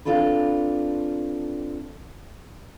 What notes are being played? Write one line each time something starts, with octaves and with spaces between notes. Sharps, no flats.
C4 D4 F4 A4 B4